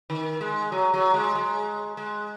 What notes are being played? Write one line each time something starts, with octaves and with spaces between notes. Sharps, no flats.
D#3
G#3
F#3
F#3
G#3
G#3
G#3